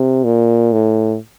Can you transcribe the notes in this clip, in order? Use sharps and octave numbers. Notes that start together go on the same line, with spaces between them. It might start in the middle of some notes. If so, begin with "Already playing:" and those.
Already playing: C3
A#2
A2